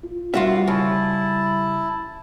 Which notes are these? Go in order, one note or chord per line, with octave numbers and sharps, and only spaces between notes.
F4
G3 F4 F#4 E5
C#3 E4 A5